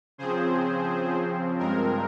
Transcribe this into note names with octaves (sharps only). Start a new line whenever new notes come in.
C#3 F3 C4 G#4 C5
G2 F3 G#3 C4 A#4